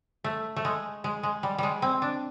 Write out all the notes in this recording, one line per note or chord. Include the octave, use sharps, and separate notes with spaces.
A3
A3
G#3
G#3
G#3
G3
G3 G#3
C4
D4